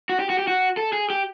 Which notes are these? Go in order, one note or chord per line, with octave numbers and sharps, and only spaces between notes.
F#4
G4
F#4
G4
F#4
A4
G#4
G4